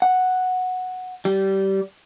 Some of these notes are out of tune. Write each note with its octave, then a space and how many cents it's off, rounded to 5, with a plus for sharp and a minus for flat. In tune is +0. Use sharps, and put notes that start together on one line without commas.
F#5 -5
G3 -20